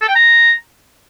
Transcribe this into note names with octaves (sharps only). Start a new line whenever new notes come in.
A4
G5
A#5